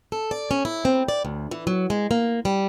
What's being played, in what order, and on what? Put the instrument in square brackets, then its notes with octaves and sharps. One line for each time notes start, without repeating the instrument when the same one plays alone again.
[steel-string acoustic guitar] A4
D5
C#4
E4
C4
D5
D2
E3
F#3
G#3
A#3
G3